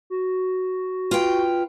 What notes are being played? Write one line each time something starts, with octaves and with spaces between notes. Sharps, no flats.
F#4
F4 B4 G5